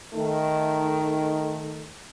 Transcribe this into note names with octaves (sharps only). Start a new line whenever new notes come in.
D#3 A3 D#4